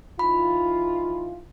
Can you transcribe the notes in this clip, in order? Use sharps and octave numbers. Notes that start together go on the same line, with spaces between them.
E3 D#4 F4 B5